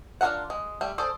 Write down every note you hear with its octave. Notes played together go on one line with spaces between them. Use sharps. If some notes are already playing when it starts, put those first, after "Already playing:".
D4 F4 G#4 A#4 F#5
G#3
G3 A3
G#4 A4 C5 D5